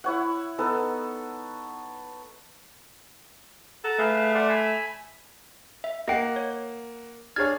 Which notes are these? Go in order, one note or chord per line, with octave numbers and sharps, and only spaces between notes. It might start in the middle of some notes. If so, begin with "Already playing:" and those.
E4 C#5 F#5
B3 D#4 A4
A4 F#5 A#5
A3 G#4 B4 F5
D5 F#5 C6
G#5 B5
E5
A#3 D#5 F#5 G5 C7
C#5
D4 G#4 C#5 F6 G#6 A6